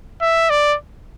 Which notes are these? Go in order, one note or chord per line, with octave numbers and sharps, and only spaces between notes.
E5
D5